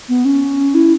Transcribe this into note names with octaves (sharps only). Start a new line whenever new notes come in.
B3
C#4
E4